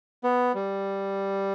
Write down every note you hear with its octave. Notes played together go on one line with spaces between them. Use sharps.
B3
G3